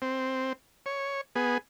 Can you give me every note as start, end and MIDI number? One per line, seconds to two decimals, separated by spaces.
0.02 0.53 60
0.86 1.21 73
1.36 1.58 59
1.36 1.58 68